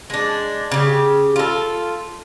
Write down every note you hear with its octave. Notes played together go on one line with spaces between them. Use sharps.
G#3 D4
C#3 G4
F4 A4